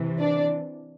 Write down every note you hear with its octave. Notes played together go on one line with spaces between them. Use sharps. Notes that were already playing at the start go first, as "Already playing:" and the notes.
Already playing: C3 E3
D4 D5